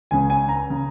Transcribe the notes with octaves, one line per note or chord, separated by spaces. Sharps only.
C#2 C#3 G#5
G#5
A#5
C#3